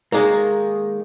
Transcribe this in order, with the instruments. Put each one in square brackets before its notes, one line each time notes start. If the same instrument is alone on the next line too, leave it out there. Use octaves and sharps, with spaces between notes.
[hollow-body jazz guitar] D#3 G#3 A#3